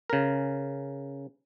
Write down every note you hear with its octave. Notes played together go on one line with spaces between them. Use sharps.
C#3 A#4